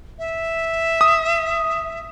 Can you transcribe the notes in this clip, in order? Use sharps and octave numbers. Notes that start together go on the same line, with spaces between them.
E5
D#6